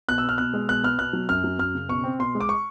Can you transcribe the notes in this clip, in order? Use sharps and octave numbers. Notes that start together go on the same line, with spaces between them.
B2 F#6
E6
B3 F6
B2 F#6
G#3
B2 F#6
B3 F6
B2 F#6
F#3
F#2 F6
F#3
F#2 F6
C#3
B2 C#6
C4
B2 C6
G#3
D6
C#6